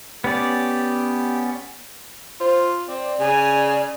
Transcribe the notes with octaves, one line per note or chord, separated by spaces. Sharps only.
B3 C#4 G4 D5
F4 C5
C4 D5
C#3 G#5